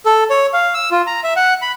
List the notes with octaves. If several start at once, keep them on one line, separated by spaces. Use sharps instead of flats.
A4
C#5
F5
E6
F4
A#5
E5
F#5
B5